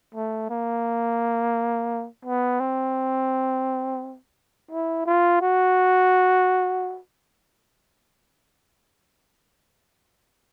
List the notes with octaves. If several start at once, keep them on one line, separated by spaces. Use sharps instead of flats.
A3
A#3
B3
C4
E4
F4
F#4